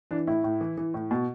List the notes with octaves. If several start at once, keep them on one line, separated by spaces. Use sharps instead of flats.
E3 D4
A2 E4
A2
E3
E3
A2
B2